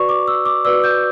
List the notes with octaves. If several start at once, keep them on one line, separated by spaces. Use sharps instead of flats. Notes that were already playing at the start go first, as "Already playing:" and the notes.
Already playing: F#4 B4 D5 C#6
D6
E6
D6
F#4 B4 D5 E6
G6